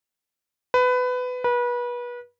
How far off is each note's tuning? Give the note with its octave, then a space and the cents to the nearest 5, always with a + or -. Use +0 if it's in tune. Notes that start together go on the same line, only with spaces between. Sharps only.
B4 +20
B4 -30